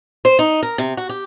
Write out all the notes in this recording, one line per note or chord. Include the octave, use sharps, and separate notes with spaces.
C5
D#4
A#4
C3
F#4
G4